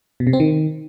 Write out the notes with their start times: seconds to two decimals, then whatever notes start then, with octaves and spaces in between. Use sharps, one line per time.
0.20 B2
0.27 C3
0.33 C4
0.40 D#3